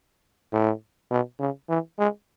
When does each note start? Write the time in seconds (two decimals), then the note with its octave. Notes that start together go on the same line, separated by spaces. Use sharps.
0.53 A2
1.11 B2
1.40 C#3
1.69 E3
1.98 G#3